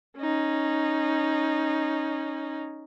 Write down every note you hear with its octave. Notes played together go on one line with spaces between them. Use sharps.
C#4 D#4